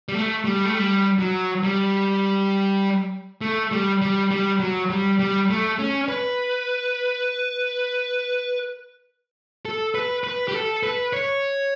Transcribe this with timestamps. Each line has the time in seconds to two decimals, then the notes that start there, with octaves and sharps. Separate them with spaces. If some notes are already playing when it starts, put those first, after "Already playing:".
0.09 G3
0.15 A3
0.45 G3
0.65 A3
0.75 G3
1.19 F#3
1.64 G3
3.41 A3
3.71 G3
4.02 G3
4.31 G3
4.60 F#3
4.90 G3
5.19 G3
5.50 A3
5.79 C#4
6.09 B4
9.65 A4
9.95 B4
10.24 B4
10.48 G4
10.54 A4
10.83 B4
11.13 C#5